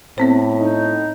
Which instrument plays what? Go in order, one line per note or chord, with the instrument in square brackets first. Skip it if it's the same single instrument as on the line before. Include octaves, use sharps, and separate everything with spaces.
[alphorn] A2 [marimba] B3 C4 C5
[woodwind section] D#4